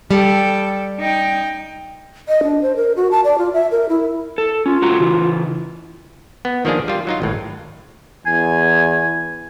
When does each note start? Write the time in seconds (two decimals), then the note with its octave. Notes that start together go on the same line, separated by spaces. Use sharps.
0.11 G3 A4 G5
1.00 D#4 G5
2.28 D#5
2.43 D4
2.62 C5
2.76 A#4
2.97 F#4
3.11 A5
3.24 D5
3.38 F4
3.53 E5
3.71 A#4
3.89 E4
4.38 A4
4.66 C#4 F4
4.82 A3 F#4 A#5
5.00 C#3 E3
6.45 B3
6.65 D#3 F3 A#3 D4 G#4
6.88 G3 F4
7.07 F#3 D#4 F4
7.22 G#1 A2
8.26 E2 G#5